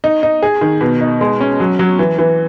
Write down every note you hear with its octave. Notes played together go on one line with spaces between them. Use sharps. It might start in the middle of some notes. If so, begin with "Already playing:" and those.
D#4
D#4
G#4
D#3
B2
D#4
G#3
C#4
F#3
F#3
E3
E3